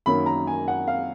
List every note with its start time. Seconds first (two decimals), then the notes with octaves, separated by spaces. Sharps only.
0.06 F#2 D#3 F#3 A#3 B5
0.26 A#5
0.47 G#5
0.68 F#5
0.88 F5